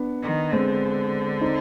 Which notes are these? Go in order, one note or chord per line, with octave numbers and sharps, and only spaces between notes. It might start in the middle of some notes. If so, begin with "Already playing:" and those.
Already playing: B3 D4
D#3
D3 G#3 C4
C4 D#4